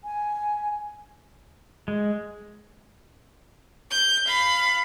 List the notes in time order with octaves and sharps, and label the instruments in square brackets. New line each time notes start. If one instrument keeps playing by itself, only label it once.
[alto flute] G#5
[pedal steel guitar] G#3
[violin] G6
F5 B5